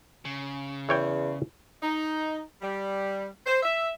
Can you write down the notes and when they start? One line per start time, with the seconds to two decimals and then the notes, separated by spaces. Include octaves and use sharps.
0.25 C#3
0.89 E2 E3 C#5 G5
1.83 D#4
2.62 G3
3.46 C5
3.63 E5